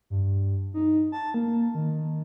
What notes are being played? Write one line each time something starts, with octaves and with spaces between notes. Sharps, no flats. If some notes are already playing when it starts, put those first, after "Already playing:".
G2
D#4
A5
A#3
D#3